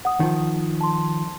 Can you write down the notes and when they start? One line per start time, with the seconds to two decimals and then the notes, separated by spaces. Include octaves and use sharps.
0.05 F#5 D#6
0.20 D#3 F3
0.81 A5 C6